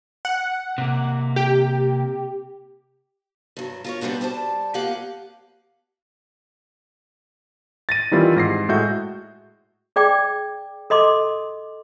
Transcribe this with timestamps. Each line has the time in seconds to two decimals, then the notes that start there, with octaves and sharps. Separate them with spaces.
0.25 F#5
0.78 C3 A#3
1.36 G4
3.57 G2 F#3
3.84 F4 A#4 C#5
4.01 G3 B3 C4 D4 F#4
4.21 G3 C5 D5 A5
4.74 F2 A#3 B3 G4 F5 F#5
7.89 A6 A#6 D#7
8.11 D#3 E3 G3 C4 E4 F4
8.36 G#2 A#6 C7
8.69 A2 G#3 F#4 E5 G6
9.96 G#4 D5 G5 D6
10.90 A4 D#5 C6 D6